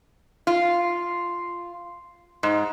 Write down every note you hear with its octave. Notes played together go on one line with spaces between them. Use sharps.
F4
G#2